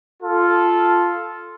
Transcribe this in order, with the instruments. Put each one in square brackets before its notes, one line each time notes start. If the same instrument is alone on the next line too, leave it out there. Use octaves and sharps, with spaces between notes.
[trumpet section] F4 A4